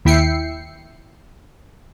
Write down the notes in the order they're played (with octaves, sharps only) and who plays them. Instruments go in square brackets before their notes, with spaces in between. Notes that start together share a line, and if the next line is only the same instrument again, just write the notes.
[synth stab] D#2 E4 E5 G5 C7 C#7